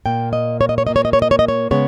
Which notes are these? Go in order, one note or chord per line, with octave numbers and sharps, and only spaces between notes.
A#2 A#3 G5
D#5
C#5
D#5
C#5
A#2 A#3 D#5
C#5
D#5
C#5
D#5
C#5
D#5
C#5
C#3 G#3 B3 C#5